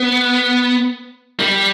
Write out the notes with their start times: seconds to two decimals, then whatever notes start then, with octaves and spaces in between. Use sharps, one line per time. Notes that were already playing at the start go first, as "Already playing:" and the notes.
Already playing: B3
1.39 G3